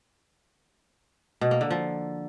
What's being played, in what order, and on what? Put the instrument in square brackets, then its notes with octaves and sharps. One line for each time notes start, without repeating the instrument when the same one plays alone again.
[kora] B2
A#3
D3
F3